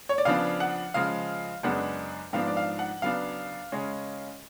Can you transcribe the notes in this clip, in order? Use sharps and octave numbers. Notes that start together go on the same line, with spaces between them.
C#5
D5
C#3 F3 B3 D4 F5
F#5
C#3 F3 G#3 F5
F#2 C#3 G#3 B3 D4 F#5
G#2 F3 B3 D4 F5
D5
F5
F#5
C#3 F#3 B3 D4 F5
C#3 G#3 C#4